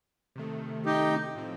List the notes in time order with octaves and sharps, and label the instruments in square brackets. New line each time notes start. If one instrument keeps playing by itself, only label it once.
[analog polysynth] C3 D#3 A3
[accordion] D#4 G4
[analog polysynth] A2 F3 C4